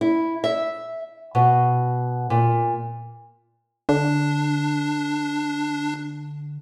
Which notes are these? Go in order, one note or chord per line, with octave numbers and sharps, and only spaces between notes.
E4
E5
B2
A#2
D3 D4